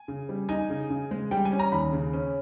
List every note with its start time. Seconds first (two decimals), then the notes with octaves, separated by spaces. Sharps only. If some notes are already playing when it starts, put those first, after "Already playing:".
Already playing: G#5
0.08 C#3
0.29 G3
0.49 D#4 G#5
0.70 C#3
0.90 C#3
1.11 G#3
1.31 G3 G5
1.45 G#5
1.52 C#4
1.59 A#5
1.72 D#2 B5
1.92 C#3
2.13 C#4